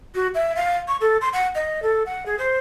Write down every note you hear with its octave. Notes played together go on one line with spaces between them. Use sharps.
F#4
E5
F5
C#6
A4
C6
F#5
D#5
A4
F#5
G#4
C5